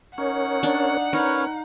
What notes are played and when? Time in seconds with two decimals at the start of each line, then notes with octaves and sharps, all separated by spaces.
0.18 C#4 D#4 A#4 C#5 F#5
0.63 D4
1.13 C#4 D#4 A#4 B4 C#5